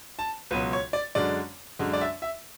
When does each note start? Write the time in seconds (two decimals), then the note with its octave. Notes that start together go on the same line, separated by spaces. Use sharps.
0.19 A5
0.51 C#2 B2 F#3 B4
0.73 C#5
0.93 D5
1.15 F#2 D3 G#3 D5
1.79 F#2 D3 G#3
1.93 D5
2.01 E5
2.22 E5